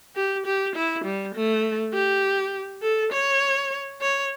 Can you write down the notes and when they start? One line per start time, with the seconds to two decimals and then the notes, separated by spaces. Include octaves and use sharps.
0.16 G4
0.46 G4
0.76 E4
1.04 G3
1.34 A3
1.94 G4
2.82 A4
3.12 C#5
4.01 C#5